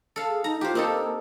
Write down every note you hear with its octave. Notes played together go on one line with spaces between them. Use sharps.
A4 F5
G#4
D#4 A#5
F4 G4 C5
A#3 C4 D#4 A4